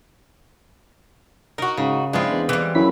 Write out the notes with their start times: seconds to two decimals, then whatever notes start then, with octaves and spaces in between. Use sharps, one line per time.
1.58 D#4 F#4 A#4
1.77 G#2 C#3
2.13 F3 G#3 C4 D4 E4 F4
2.31 E2
2.49 E3 G3
2.75 F#2 C#4 E4 B5